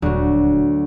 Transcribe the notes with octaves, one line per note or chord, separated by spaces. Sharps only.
D#1 D2 F#3